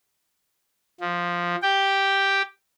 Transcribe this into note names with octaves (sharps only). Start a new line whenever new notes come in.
F3
G4 G5